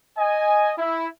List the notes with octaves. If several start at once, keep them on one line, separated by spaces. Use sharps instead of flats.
D#5 G#5
E4